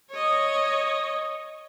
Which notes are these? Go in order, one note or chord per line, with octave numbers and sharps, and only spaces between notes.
C#5 D#5